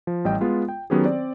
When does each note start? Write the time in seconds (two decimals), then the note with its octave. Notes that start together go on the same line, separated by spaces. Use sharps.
0.07 F3
0.25 A1 G3 D#5 G5
0.41 G#3 B3 F4
0.69 G5
0.90 D#3 F#3 B3 C#4 G4 G#4
1.05 C4 D5